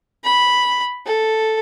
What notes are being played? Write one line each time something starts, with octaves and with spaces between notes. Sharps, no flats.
B5
A4